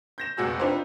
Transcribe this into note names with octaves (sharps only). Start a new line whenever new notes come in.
G6 A#6 E7
F1 C#2 C3 F#4 G#4 E6
D4 D#4 F4 G4 B4 C5